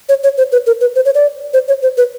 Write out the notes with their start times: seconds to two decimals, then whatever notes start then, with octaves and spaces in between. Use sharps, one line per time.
0.09 C#5
0.24 C#5
0.38 C5
0.52 B4
0.67 A#4
0.81 B4
0.96 C5
1.05 C#5
1.15 D5
1.54 C5
1.68 C#5
1.82 C5
1.97 B4